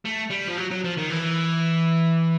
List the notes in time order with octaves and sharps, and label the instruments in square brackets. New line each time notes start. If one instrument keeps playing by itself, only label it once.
[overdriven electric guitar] A3
G3
F3
F#3
F#3
F3
D#3
E3